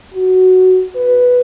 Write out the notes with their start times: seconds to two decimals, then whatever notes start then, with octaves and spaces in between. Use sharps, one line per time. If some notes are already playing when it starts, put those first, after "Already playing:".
0.14 F#4
0.95 B4